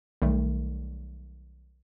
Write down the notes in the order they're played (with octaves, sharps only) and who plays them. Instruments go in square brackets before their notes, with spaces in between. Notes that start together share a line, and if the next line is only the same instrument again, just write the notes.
[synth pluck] B1 D#3 G3 A3